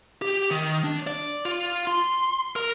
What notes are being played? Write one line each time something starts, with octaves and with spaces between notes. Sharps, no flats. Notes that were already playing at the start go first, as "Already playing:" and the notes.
G4
D#3
D4
D5
F4
C6
A#4